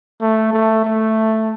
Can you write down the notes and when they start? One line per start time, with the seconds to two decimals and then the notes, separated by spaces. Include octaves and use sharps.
0.21 A3
0.53 A3
0.84 A3